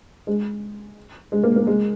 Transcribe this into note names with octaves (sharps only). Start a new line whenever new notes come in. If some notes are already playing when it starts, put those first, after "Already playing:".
G#3
G#3
A#3
A#3
G#3